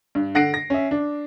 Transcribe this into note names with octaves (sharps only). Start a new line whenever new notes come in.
G2
D3 F#5 A#6 C7 D7
A#6
C#4 E5
D4